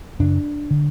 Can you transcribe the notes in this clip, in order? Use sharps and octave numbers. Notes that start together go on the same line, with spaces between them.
F#2 C#3 D4
D3